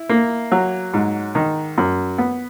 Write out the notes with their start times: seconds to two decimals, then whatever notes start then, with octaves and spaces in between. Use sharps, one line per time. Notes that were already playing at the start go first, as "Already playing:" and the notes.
Already playing: E4
0.10 A#3
0.52 F#3
0.94 G#2
1.35 D#3
1.78 F#2
2.18 B3